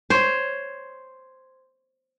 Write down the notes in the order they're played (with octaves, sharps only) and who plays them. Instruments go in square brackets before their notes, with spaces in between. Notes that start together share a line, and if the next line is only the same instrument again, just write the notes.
[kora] C5 C#5